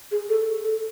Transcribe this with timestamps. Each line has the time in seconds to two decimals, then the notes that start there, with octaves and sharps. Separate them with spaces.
0.11 G#4
0.29 A4
0.64 A4